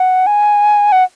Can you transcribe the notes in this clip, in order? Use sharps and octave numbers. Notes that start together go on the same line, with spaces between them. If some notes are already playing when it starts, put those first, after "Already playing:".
Already playing: F#5
G#5
F#5